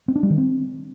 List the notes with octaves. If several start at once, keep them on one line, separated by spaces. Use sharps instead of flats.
C4
D4
G3
D#3
C4